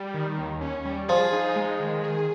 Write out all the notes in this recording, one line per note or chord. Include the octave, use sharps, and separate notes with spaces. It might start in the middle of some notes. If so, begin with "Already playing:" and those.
Already playing: G3
D#3
D#2
C#4
G3
F3 G#4
D#4
G#3
D#3
G#4